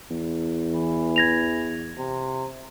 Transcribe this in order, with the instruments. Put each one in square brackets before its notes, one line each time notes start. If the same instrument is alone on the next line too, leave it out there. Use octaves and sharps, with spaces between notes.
[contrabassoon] E2
[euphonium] E3
[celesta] G#6 A#6 F7
[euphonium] C3